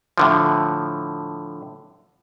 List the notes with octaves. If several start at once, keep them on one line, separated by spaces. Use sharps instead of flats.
A2 D3 F3